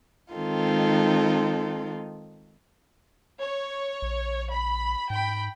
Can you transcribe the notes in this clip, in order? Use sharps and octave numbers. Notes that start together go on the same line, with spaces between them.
D#3 G#3 C4 D#4 F4 A4
C#5
A#1
B5
G#2 G5 B5